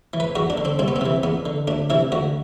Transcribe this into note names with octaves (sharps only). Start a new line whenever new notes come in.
E3
B4
E2 F#4
D4
D3
C4
C2 C4
B3
C4
C3 E3
E2 B3
D3
D2 D4
C3 E3 E4
D2 F#4